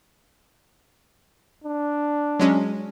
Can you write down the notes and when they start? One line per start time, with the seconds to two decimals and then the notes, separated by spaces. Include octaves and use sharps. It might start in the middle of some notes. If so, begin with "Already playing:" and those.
1.64 D4
2.40 F#3 G#3 C#4